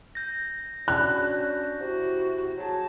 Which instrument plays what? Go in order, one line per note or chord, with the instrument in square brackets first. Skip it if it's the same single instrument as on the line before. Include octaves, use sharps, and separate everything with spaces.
[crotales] G6 A#6
[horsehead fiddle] C#4 F#4 [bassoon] D4 [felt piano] F#6
[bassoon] C3 [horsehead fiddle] E4 F#4
[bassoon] F#3 [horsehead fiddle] G#4 A5